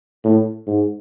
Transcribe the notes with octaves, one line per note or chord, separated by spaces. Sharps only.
A2
G#2